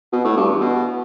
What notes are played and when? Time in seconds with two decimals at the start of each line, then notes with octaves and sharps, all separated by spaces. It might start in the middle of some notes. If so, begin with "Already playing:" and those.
0.13 B2
0.25 A2
0.37 G2
0.48 E2
0.60 B2